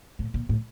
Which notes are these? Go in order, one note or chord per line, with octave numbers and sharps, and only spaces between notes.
A2
A#2
A2